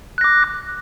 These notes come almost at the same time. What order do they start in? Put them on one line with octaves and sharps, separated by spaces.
F#6 A#6 D6